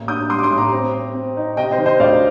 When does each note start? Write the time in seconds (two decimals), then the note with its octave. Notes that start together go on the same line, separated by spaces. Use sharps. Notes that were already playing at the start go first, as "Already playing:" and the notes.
Already playing: A1 A#3
0.08 D4 D#6 G6
0.29 G3 C6 D#6
0.39 D6
0.43 C6 D#6
0.51 A1
0.58 A#5 D6
0.72 C4
0.94 C4
1.14 C4
1.37 D#4
1.57 C3 D#5 G5
1.71 C5 D#5
1.78 D#3
1.86 C5 D#5
1.99 D2 D5 F5